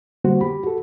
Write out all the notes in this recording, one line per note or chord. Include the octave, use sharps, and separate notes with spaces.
D3 G3 A#3 B3 F#4 C5
G4 B5
F#4 A4